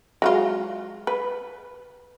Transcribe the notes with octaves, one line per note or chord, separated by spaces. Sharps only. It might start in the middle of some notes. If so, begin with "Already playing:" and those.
F#3 G#3 F4
B4